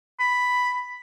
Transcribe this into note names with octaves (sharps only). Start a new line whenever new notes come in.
B5